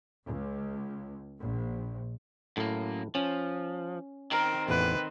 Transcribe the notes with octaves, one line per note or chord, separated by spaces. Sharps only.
C#2
A#1
F#2 A2 A#3
F3 C#4
D#3 C4 A#4
A1 E2 B4